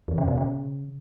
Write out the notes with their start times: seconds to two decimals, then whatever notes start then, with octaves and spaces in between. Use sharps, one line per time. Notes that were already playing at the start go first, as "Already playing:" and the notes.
0.08 E2
0.18 C#3
0.28 B2
0.38 C#3